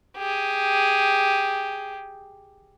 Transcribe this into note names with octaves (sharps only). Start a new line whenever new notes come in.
G4 G#4